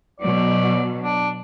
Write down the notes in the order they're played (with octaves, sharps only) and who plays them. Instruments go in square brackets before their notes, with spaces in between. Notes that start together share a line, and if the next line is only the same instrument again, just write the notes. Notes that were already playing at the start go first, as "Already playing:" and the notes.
[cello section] B2 F#3 [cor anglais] D5
[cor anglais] D4